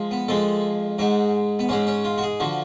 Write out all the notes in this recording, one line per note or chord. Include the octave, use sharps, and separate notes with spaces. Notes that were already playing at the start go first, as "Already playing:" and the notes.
Already playing: F3 G#3
B3
F2 F3 G#3 A4
G#2 G#3 F#4
B3
G#2 G#3 C#4
C#4
F4
F#4
G#4
D3 F3 F#4